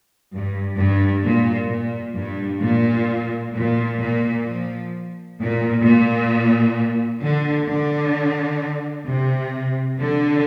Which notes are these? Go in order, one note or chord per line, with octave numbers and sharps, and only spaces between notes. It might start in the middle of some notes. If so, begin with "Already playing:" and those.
G2
G2
A#2
A#2
G2
A#2
A#2
A#2
F3
A#2
A#2
D3
D3
C3
D3